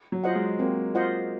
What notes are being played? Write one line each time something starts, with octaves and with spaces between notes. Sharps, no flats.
F#3
F4 C5 D#5 F#5
G#3
A#3 C4
F4 C5 D#5 F#5